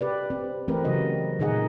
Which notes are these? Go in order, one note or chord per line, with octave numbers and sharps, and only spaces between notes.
G4 B4 D5
C4 G4
E3 A3 C4 G4 A#4 B4
C#3 F#3 F#4 D#5
A#2 D#3 D#4 G#4 D#5 F#5